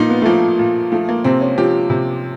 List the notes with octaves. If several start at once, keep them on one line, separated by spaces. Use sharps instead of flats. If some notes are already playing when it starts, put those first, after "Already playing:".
Already playing: A#2 F3 D#4 F4
B3
A3
F3 A#3
A#2
F3 A3
A#3
C3 C4
C#4
F3 G4
C3